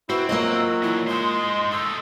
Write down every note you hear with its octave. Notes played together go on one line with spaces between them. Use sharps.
C4 E4 F#4 B4
F#3 A#3 F4 D#5 E6
A#2 E3 E4
G#3 D#4 C5 C6
A3 D#4 E6